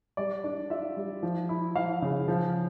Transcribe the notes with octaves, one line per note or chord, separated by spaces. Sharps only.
G3 D5
D4
F4 E5
G3
F3
E4
F3 F5
C#3
F3